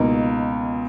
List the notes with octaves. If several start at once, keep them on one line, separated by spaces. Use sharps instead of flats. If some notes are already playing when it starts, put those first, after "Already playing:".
Already playing: C#2 B2 A#3 D#4